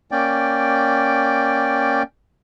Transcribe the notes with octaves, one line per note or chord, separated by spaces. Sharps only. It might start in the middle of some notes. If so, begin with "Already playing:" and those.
A#3 C#4 D5 G5